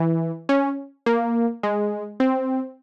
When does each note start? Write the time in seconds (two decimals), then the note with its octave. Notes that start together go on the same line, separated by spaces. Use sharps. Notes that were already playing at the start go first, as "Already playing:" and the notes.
Already playing: E3
0.49 C#4
1.06 A#3
1.63 G#3
2.20 C4